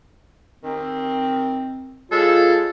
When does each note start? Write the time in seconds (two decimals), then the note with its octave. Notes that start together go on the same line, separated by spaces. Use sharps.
0.64 D#3 C4
2.12 G#3 F4 A4 C#5